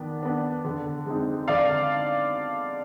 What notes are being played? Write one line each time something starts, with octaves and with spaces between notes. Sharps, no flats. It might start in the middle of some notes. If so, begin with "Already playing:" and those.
Already playing: D#3 B3 D4
B3 D4
D3
G#3 C4 D#4
D3 D5 F5